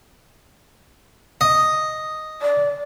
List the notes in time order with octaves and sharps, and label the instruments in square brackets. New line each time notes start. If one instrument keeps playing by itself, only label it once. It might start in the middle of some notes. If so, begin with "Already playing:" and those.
[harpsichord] D#5
[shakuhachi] D5